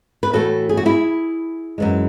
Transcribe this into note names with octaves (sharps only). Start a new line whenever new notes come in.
B4
A2 E3 A3 F#4 A4
G#4
F#4
E4 G#4
F#2 E3 G#3